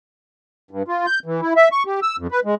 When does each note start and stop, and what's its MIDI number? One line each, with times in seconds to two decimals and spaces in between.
0.71 0.83 43
0.88 1.06 65
1.06 1.19 91
1.26 1.41 52
1.41 1.54 64
1.56 1.69 76
1.72 1.83 85
1.86 2.00 67
2.02 2.16 88
2.18 2.27 41
2.31 2.40 71
2.45 2.55 56